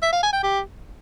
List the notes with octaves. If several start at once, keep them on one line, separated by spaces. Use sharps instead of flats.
E5
F5
G#5
G5
G4